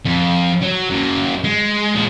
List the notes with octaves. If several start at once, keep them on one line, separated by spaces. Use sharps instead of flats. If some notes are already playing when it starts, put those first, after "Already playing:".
F2
F#3
F#2 A#3
G#3
A#2 G#4